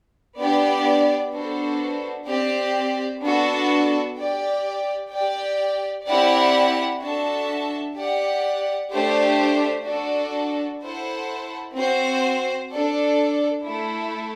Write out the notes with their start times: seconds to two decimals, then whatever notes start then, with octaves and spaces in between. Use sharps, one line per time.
0.38 B3 D4 G4 D5
1.33 B3 D4 F#4 A4 C5
2.28 C4 G4 D5
3.22 B3 D4 F#4 A4
4.17 G4 D5 G5
5.12 G4 D5 G5
6.07 C4 E4 G4 D5 F#5
7.02 D4 F#4 A4 E5 A5
7.97 G4 D5 F#5
8.92 A3 D4 G4 C5
9.87 D4 F#4 A4
10.82 E4 A4 C5 F#5
11.76 C4 F#4 C5
12.71 D4 A4 D5
13.66 A3 E4 A4